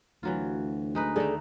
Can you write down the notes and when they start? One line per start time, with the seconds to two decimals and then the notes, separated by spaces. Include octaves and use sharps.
0.23 D2 E3 F#3 F4
0.95 G#3 D#4 B4
1.16 D#3 A3 G#4 A4 D5